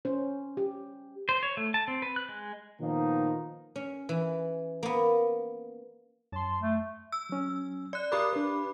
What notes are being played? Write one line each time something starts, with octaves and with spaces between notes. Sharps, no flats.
C#4 C5
G4
C5
C#5
A3
A5
C4
B4
F#6
G#3
A#2 D#3 F3 A#3 B3 D#4
C#4
E3
A#3 B3
F#2 A5 C6
A3
E6
F#3 C#4
D5 F#6
G4 A#4 D5 B5 D6 D#6
D4 B4